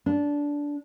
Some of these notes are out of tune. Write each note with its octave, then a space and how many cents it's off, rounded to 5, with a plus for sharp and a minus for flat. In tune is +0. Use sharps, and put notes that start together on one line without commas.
D4 -15